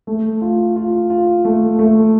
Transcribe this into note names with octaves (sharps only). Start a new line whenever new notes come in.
A3
F4
F4
F4
A3
A3